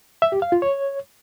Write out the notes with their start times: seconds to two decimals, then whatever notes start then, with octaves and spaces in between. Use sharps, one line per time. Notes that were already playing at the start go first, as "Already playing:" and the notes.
0.22 E5
0.32 G4
0.42 F5
0.52 F4
0.62 C#5